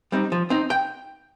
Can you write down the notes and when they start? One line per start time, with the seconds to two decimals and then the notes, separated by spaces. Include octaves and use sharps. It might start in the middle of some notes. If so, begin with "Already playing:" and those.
0.12 G3 C4 D#4
0.32 F3
0.50 C4 D#4
0.70 G5